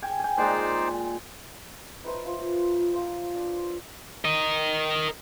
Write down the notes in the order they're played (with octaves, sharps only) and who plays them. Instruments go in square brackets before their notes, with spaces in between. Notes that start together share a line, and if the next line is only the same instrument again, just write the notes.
[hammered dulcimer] G5 G#5
G5 G#5
[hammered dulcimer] A#2 G#3 [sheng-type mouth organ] D#4 C5 D5
[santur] D#4 B4 C5 E5
F3
F4
C5 F5 G5
D4
[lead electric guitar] A#4 D#5